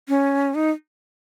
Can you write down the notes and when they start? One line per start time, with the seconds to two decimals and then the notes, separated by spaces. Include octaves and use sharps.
0.09 C#4
0.55 D#4